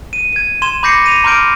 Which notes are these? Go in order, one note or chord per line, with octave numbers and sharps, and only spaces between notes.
D#7
G#6 D#7
C6 G#6 E7 G7
B5 D6 G6 A#6 C7 C#7
A#6 D#7 F7
A#5 C6 D6 F6 G6 D7